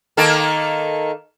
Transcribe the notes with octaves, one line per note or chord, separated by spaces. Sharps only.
D#3 A#3 A4